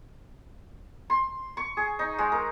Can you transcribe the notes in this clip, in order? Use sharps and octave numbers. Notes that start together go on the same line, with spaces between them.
C6
C#6
G#4
D#4
G#3
A#4